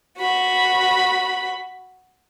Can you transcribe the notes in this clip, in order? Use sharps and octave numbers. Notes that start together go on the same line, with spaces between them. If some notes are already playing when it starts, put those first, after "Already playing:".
F#4 B5